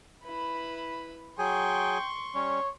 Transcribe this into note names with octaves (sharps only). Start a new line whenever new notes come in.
E4 B4
F#3 G#4 G5 G#5 C6 C#6
G3 C#4 C#5